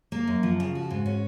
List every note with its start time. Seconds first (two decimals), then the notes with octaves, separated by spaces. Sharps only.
0.12 A#3
0.27 F#2
0.43 F3
0.60 C#3
0.75 F#4
0.91 G#2
1.06 C#4